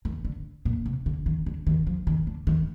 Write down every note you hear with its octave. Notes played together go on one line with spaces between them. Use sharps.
D#3
D3
A#2
C3
D3
D#3
D3
D#3
F3
D#3
D3
D#3